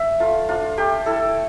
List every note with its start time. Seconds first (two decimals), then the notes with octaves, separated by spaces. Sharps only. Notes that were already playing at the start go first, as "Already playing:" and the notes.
Already playing: E5
0.20 A3 F4
0.49 D4 F4
0.77 A3 G4
1.06 E4 A4